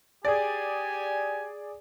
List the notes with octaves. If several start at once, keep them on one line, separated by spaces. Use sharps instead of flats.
G4 G#4 D5 G#5